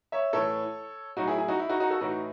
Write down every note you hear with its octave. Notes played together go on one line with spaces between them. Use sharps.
C#5 E5
A2 E3 A4 C#5
A2 F#3 D#4 F#4
E4 G#4
E4 G#4
D#4 F#4
E4
D#4 F#4
D#4 F#4
F#4 A4
A2 E3 D#4 F#4